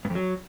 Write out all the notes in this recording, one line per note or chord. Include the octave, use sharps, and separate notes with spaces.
G2
F2
F#3